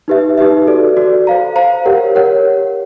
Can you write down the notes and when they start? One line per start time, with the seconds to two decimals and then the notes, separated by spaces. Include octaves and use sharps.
0.08 D#4 G4 B4 E5
0.38 D#4 G4 B4 E5
0.67 F#4 A4 D5
0.97 F#4 A4 D5
1.27 C5 F5 A#5
1.56 C5 F5 A#5
1.85 G4 A#4 C#5 F#5
2.15 G4 A#4 C#5 F#5